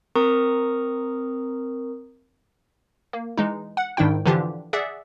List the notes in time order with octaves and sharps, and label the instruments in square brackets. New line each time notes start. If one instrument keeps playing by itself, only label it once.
[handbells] C4 A#4 A#5 C#6 D#6
[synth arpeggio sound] A#3
E3 G#3 D#4
F#5
G#2 D#3 D4 E4 G5
D3 E3 F3 D4 F4 G4
G#4 D5 E5 F#5